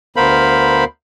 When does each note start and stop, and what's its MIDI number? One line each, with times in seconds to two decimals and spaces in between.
0.16 0.84 38
0.16 0.84 59
0.16 0.84 70
0.16 0.84 72
0.16 0.84 77
0.16 0.84 83